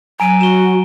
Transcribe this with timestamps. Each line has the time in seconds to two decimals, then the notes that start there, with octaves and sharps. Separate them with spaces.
0.20 F#3 G#5 A#5 D7 D#7
0.41 F#4 E7 G7